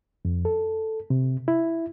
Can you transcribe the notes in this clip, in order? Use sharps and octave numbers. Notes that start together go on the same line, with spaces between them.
F2
A4
C3
E4